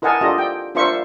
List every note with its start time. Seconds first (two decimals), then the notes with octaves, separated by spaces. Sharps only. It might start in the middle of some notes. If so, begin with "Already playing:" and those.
0.02 E4 A#4 D#5 F#5 G#5 A5
0.21 D4 F4 G4 A4 D#5 A#5
0.38 G5
0.75 D4 F4 A#4 C5 E5 C#6